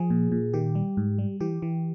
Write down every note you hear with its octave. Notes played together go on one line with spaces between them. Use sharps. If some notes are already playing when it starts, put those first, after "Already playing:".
Already playing: F3 G#4
A#2
A#2
D#3 G4
G3
G#2
G3
E3 G4
E3